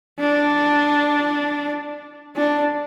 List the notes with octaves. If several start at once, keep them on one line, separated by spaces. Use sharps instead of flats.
D4
D4